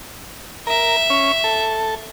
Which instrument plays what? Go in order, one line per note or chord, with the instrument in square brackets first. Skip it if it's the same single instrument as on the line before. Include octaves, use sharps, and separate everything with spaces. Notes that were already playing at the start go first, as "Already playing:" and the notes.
[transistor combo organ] A#4 [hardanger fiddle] E5
[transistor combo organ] C#4
A4